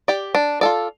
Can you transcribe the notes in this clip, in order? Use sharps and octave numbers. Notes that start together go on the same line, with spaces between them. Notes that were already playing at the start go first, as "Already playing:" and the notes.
G4 D5
D4
F4 A4 D5